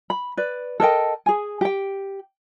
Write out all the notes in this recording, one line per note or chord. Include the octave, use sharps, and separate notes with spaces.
B5
B4 D5
A4 A#4 D#5 G5
G#4 G#5
G4 G5